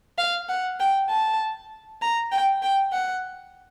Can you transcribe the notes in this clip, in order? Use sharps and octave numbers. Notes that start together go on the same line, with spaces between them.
F5
F#5
G5
A5
A#5
G5
G5
F#5